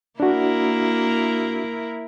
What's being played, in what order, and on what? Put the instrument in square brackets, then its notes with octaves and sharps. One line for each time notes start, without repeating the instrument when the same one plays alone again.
[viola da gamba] A#3 E4 A#4 [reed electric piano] D4 F#4